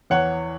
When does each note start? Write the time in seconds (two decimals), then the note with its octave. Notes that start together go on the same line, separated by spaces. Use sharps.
0.10 E2 E3 C#5 F#5